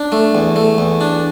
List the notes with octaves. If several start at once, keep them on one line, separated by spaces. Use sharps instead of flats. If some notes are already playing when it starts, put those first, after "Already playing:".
Already playing: D4
A3
E2
A3
E2
D4